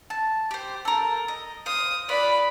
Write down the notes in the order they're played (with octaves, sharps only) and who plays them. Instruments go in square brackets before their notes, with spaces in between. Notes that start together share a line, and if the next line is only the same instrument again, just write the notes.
[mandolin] A5
G4 C5
A4 A#4
D#5
[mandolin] C5 F5 [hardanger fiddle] D#6
[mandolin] F4 B4 [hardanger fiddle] D5 B5